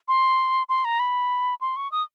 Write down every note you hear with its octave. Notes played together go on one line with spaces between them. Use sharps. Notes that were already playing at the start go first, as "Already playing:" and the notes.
C6
C6
A#5
B5
C6
C#6
D#6